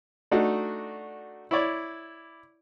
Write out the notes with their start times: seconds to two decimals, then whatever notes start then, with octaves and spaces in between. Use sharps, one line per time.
0.31 A3 D4 D#4 F#4
1.51 E4 C#5 D5